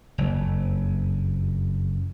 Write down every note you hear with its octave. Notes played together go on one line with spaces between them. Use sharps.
F#1 F2